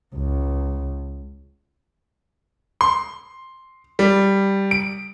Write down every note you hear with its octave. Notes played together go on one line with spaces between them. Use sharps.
C#2
C6
G3
D7